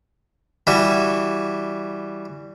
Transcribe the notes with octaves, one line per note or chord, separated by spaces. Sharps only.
E3 G3 F#4